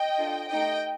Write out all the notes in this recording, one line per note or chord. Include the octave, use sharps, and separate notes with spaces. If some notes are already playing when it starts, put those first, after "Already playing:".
Already playing: D#5 G5
D4 F4 A4
A3 D#4 G4 D#5 G5